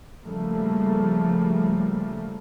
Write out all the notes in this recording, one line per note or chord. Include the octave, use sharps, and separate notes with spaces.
C#3 F3 G3 A3 A#3